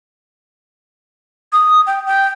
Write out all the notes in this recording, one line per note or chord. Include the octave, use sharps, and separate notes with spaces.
D#6
G5
G5